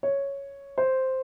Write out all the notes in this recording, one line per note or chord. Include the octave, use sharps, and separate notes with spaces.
C#5
C5